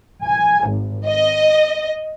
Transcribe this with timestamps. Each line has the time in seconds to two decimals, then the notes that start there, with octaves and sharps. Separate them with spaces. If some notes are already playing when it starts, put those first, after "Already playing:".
0.24 G#5
0.68 G#1
1.06 D#5